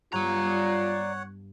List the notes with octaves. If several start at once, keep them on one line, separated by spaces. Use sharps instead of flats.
G2 G3 B3 F4 C#5 D5 F#5 A#5